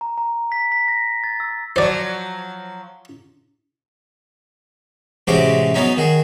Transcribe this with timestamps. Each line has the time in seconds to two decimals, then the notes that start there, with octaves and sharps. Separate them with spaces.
0.01 A#5
0.18 A#5
0.52 B6
0.72 B6
0.88 A#6
1.24 A6
1.40 E6
1.76 F3 F#3 C5 D5
5.27 A1 C3 G#3 C#4 F#4 D6
5.74 F#3 B3 C#4 D#4
5.97 D#3 F#4 G#4